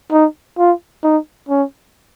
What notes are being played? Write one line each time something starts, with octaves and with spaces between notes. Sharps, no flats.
D#4
F4
D#4
C#4